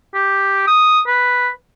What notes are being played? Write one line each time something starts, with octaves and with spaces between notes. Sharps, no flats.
G4
D#6
B4